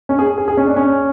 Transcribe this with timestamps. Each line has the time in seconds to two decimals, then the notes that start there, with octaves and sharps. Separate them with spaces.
0.09 C#4
0.19 G#4
0.38 G#4
0.48 G#4
0.57 C#4
0.67 D4
0.77 C#4